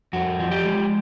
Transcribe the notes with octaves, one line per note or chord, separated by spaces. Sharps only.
F2 F#4
F3
G4
G#3